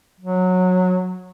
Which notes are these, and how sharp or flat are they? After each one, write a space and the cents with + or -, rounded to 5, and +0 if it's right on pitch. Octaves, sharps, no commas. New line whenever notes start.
F#3 -15